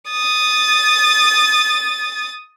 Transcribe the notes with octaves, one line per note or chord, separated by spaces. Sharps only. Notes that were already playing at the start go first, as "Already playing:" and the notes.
D#6 A6